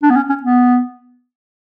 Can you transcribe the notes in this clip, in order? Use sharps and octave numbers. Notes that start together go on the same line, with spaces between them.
D4
B3
C#4
C#4
B3